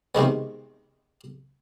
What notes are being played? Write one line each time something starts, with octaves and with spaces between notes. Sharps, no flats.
C3 D#3 G#3 B3